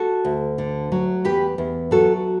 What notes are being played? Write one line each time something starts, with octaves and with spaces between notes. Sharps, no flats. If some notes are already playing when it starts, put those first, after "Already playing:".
Already playing: F#4 A4
D2
D3
F#3
E2 G4 B4
E2
F#3 F#4 A4